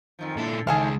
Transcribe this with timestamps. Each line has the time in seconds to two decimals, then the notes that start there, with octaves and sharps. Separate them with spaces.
0.19 F2 D#3 F3
0.37 A#2 D3 E4 A4
0.67 C#2 A2 D3 D#3 G#3 G#4 A4 F5